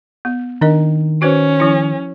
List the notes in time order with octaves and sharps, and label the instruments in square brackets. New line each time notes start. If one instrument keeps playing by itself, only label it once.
[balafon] B3
[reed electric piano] D#3 [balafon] D4 A#4 D#5
[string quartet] C#4 [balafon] F#4 B4 C5
[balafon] F3 E4